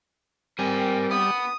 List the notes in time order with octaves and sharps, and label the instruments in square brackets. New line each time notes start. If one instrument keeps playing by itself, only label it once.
[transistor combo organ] G3 [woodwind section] C4 [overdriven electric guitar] A#4 G#5
[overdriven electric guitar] B3 [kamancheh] D#6